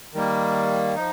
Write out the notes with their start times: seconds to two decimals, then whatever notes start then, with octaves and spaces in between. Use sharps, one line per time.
0.14 D#3 G3 A#3
0.96 F3 D#4